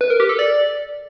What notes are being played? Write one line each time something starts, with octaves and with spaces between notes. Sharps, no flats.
B4
A#4
G4
A4
D5